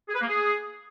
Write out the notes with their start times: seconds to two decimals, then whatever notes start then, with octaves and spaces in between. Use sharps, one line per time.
0.08 G#4
0.15 B4
0.21 A#3
0.28 G#4